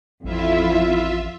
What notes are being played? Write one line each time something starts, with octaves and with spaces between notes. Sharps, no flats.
A1 F2 E4 F4 E5